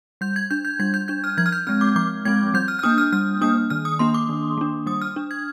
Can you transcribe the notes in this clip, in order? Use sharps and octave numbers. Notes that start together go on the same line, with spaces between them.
G3 G6
G#6
D4 G6
G6
G3 G#6
G6
D4 G6
F6
F3 G#6
F6
G6
G#3 C4 F6
D6
F3 D6
G#3 C4 G#6
G3 G6
F6
F6
A#3 D4 D#6
F6
G3 F6
A#3 D4 D#6
D#3 F6
D#6
A#3 D4 C6
D6
D#3
A#3 D4
G3 D#6
F6
D4
G#6